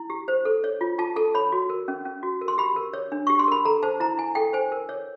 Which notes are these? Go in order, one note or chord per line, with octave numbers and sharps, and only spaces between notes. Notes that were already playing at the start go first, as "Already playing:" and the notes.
Already playing: E4
G4
C5
A4
C#5
F4
F4 A5
A4 A5
C#5 B5
F#4
A#4
C#4
C#4
F#4
A#4
C6
G4 B5
A#4
C#5
D4
G4 C#6
C6
A#4 B5
A4 A#5
C5 A5
E4 A#5
E4 G#5
A4 G5
C5 G#5
A#4
C#5